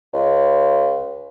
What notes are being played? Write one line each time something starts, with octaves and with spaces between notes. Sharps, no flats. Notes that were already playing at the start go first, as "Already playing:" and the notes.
C#2